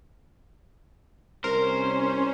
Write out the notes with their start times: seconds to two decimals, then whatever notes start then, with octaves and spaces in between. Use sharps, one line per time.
1.44 C2 C#4 A#4 C5